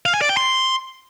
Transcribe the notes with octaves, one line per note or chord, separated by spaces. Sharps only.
F5
G#5
D5
G5
C6